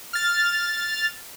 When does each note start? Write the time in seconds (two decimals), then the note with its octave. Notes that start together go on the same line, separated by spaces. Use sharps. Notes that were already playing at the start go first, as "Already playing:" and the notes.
0.13 F6 A6